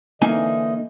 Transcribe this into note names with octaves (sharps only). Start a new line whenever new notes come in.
D3 E3 A#3 D#4 D#5 G#5